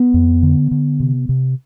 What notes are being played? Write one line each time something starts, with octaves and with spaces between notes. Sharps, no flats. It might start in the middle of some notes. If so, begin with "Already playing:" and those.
Already playing: B3
F2
D3
D3
C3
C3